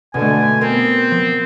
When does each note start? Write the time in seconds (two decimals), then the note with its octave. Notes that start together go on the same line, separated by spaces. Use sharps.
0.14 B2 D3 A3 G#5
0.61 B3 C4 A#4
1.11 F3